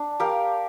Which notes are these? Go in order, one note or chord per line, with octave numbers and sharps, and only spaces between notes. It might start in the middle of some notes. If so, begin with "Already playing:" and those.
Already playing: D4
G4 A#4 F5